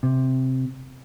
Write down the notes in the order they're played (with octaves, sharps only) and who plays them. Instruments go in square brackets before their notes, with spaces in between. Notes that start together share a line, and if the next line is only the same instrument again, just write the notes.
[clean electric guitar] C3